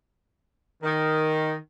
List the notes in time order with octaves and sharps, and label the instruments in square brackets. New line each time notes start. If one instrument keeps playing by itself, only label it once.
[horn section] D#3